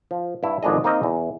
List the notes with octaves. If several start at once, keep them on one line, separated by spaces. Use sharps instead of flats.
F3
G2 E4
G#1 F2 D4 G#4 D#5
A#3 C4 D#4 C5 D#5
E2